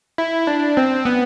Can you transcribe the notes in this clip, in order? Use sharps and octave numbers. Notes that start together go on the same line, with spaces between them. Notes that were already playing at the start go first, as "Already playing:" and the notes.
E4
D4
C4
B3